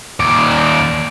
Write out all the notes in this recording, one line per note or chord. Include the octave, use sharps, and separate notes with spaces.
D#2 D5